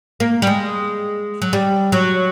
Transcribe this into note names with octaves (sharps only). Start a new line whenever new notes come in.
A#3
G3
G#3
F#3
G3
F#3